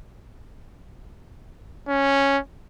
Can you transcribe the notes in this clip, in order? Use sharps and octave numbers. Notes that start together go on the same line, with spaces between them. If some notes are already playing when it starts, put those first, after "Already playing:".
C#4